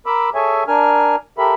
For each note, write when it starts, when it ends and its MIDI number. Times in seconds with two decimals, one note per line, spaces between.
0.06 0.30 70
0.06 0.30 83
0.06 0.30 86
0.06 0.30 88
0.35 0.64 68
0.35 0.64 69
0.35 0.64 73
0.35 0.64 76
0.35 0.64 80
0.68 1.16 62
0.68 1.16 70
0.68 1.16 80
0.68 1.16 89
1.38 1.55 67
1.38 1.55 69
1.38 1.55 70
1.38 1.55 76
1.38 1.55 83